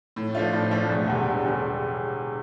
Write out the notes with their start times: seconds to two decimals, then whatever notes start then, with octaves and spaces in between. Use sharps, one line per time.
0.16 A2
0.35 F3 A3 D4 F4
0.53 A2
0.71 F3 A3 D4 F4
0.89 E1
1.08 E2 D3 G3
1.26 E1
1.44 E2 D3 G3